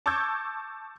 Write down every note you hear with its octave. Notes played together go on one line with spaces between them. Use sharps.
A5 C#6 D6 E6 G6 G#6